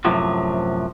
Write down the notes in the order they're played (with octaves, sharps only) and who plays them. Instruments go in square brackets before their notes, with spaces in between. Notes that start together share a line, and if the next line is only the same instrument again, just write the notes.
[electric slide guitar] F#2 A2 C3 F3 F#3